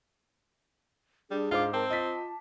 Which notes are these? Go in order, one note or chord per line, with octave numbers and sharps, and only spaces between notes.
G3 D4 G#4
G#2 F4 C5 D6
C4 A#4 A5
F4 D#5 A6 B6